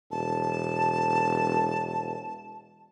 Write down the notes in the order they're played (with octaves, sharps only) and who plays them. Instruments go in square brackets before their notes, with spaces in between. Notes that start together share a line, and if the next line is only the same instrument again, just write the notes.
[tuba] E1 [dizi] A5